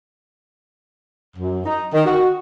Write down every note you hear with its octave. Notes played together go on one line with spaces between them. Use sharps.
F#2
D#4
D#3
F#4